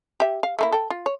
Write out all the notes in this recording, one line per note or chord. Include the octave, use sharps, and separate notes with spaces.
G4 E5
F5
A3 A#3 E4
A4 G5
F4
C#5